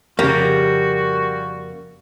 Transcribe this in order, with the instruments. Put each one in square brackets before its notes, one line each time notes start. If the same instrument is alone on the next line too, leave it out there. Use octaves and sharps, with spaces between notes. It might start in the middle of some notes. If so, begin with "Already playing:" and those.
[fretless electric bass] F2 C#3 [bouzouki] G3 [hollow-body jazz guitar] A#3 [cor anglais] F#4